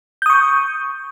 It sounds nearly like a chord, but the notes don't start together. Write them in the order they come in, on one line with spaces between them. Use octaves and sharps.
G6 D#6 C#6